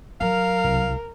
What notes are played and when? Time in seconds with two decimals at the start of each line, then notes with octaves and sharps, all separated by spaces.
0.21 F#3 A#4 F5
0.64 C2